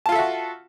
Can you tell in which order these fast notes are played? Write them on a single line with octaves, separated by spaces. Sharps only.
A5 F4 A4 E5 F#4